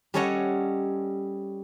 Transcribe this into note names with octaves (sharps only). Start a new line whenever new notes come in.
G3 C#4 A4 C#5 D#5 F#5